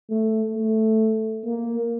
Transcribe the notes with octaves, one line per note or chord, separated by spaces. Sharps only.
A3
A3
A#3